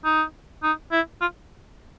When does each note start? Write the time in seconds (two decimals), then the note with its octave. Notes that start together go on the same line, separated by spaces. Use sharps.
0.04 D#4
0.63 D#4
0.92 E4
1.21 F4